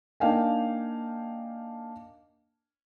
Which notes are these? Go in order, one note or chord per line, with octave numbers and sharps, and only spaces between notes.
A#3 D4 D#4 F5 G5 G#5